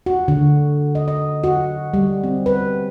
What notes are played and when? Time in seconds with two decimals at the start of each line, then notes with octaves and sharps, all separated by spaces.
0.06 F#4
0.28 D3
0.95 D#5
1.08 D#5
1.44 F#4
1.93 G3
2.24 C4
2.46 B4